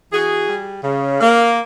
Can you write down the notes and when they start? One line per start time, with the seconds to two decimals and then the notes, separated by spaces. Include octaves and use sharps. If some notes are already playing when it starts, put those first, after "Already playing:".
0.12 E3 F#4 G#4
0.49 G3
0.84 C#3
1.20 A#3